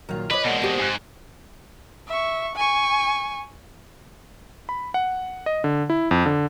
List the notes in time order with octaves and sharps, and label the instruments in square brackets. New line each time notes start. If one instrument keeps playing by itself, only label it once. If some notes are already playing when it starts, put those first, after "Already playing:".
[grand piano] A#2 F#3 [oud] D#3 F4
[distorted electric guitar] B4 [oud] C#5 D#5 [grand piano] B5 D6
[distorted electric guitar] B2 G#3 [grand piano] A#3 D5 F#5
[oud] C4 G4
[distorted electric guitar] G#2 [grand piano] G#5 F#6
[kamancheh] E5 C#6
G#5 C#6
[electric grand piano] B5
F#5
D#5
D3
E4
F2
D3